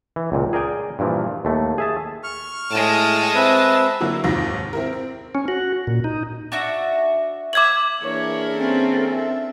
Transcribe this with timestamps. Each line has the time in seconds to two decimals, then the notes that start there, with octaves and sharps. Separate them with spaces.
0.16 E3
0.32 C#2 A#2
0.53 G#4 A#4 D5 G5 G#5
0.99 G2 A#2 E3 F3
1.45 D#2 A3
1.78 G#4 E5 A5
2.23 C#6 F6
2.71 A2 G#3 A5
3.35 C4 B4 E5
4.00 D3 F#3 A#3 E4
4.24 F1 D#2 G#2 D#3 F4 A#6
4.73 C4 E4 A#4
4.93 C4
5.35 C#4
5.48 F#4
5.87 A#2
6.04 D#4
6.52 D4 F#4 E5
7.53 C#5 E5 D6 G#6 F#7
8.03 E3 A#3 D4 E4 G#4 A#4 C#5
8.55 C4 C#4 A4
9.09 E5